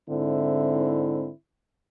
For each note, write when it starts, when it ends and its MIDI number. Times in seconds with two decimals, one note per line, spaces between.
0.10 1.30 44
0.10 1.30 50
0.10 1.30 60
0.10 1.30 64